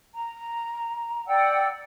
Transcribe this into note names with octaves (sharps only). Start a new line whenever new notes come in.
A#5
D5 F#5 G5 E6